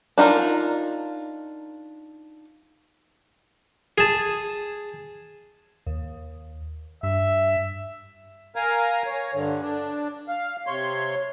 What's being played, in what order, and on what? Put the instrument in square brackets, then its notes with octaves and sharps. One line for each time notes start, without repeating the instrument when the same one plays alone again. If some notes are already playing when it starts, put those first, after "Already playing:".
[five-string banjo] D4 D#4 F4 A#4
[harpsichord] G#4 A5
[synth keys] D#2
[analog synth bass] G2 [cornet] E5
[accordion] A#4 F5 G#5 A#5
C#5
G2 D3
D4
F5
C3 C#5 C6